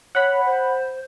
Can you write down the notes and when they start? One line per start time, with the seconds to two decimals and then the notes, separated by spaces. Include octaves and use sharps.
0.15 C#5 F#5 B5
0.46 C5